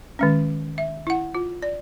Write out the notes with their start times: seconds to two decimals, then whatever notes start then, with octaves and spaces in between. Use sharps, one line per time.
0.19 D#3 G#3 C#4
0.78 E5
1.07 E4 F#5
1.35 F4
1.62 D5